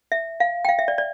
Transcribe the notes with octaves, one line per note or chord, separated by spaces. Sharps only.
E5
F5
G5
F5
E5
D5
D5